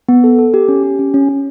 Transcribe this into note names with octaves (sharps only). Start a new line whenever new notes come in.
B3
A4
A4
G4
C#4
G4
C#4
C#4
C#4